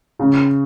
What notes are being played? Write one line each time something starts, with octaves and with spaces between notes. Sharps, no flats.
C#3